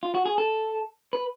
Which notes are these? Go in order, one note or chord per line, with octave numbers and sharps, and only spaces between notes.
F4
F#4
G#4
A4
B4